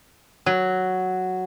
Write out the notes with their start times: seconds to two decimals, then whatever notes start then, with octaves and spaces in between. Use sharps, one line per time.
0.46 F#3